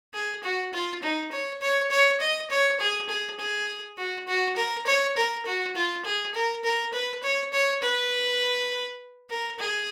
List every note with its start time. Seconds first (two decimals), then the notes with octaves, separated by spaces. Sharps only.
0.14 G#4
0.43 F#4
0.73 F4
1.02 D#4
1.32 C#5
1.61 C#5
1.90 C#5
2.20 D#5
2.50 C#5
2.80 G#4
3.08 G#4
3.39 G#4
3.97 F#4
4.27 F#4
4.56 A#4
4.86 C#5
5.16 A#4
5.45 F#4
5.75 F4
6.05 G#4
6.34 A#4
6.64 A#4
6.93 B4
7.23 C#5
7.52 C#5
7.82 B4
9.29 A#4
9.59 G#4